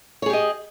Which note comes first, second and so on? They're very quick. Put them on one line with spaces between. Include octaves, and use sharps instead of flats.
C#5 G#4 G4 D#5